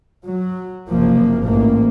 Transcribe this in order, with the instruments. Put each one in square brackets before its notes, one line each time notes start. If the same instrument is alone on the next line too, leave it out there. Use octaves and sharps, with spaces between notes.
[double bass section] F#3
F#1 C3 F3 A#3
A1 G#2 A#3